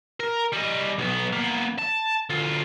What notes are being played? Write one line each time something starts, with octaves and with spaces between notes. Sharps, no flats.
A#4
G3 D#5
B1 B3
A#3 B3
A5
D2 F4